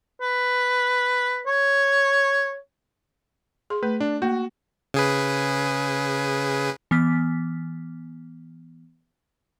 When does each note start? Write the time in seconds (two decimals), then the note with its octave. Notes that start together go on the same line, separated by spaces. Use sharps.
0.22 B4
1.47 C#5
3.70 G#4 C6
3.83 A3 B4
4.00 D4
4.22 A#3 F#4
4.94 C#3 G#4 B4
6.91 E3 B3 F6 B6